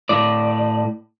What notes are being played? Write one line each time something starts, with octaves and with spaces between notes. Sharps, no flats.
A2 D5